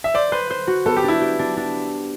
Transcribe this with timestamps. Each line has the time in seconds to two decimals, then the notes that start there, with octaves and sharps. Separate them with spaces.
0.04 E5
0.14 C5 D5
0.32 B4 C5
0.50 C5
0.67 F#4
0.86 B3 A4
0.97 G4
1.04 D4 E4
1.21 G4
1.39 D4
1.57 D4